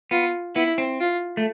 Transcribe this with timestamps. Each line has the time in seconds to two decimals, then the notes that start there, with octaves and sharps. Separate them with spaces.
0.11 B3 F4
0.56 B3 E4
0.78 C4
1.01 F4
1.37 A3